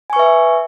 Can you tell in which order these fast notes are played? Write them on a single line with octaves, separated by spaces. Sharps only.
G#5 C#6 B4 E5